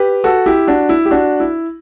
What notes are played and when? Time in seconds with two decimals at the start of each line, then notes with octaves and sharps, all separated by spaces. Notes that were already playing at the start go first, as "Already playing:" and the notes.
Already playing: G4 B4
0.24 F#4 A4
0.46 E4 G4
0.67 D4 F#4
0.89 E4
1.06 G4
1.11 D4 F#4
1.40 E4